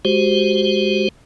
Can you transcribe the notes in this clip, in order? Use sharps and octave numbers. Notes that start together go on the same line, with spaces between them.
G#3 F#4 G4 C5